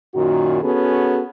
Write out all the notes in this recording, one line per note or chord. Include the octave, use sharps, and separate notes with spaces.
F#2 A#2 D#3 F#4
B3 C#4 F#4 G#4 A4